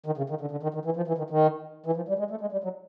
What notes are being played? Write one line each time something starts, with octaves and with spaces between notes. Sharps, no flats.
D#3
C#3
D#3
D3
D3
D#3
D#3
E3
F3
E3
D#3
D#3
E3
F3
G3
G#3
A3
G#3
G3
F#3